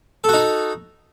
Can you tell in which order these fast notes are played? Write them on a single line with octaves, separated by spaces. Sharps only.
A4 F#4 D#4